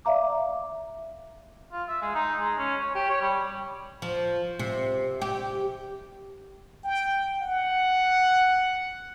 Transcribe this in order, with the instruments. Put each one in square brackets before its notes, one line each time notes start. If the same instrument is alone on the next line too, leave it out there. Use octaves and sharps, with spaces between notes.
[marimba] D5 E5 F5 A#5 D6
[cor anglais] F4
E5
G#3
D#4
G#3
C#4
C#5
G4
C#5
G3
[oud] F3
C3
G4
[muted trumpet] G5
F#5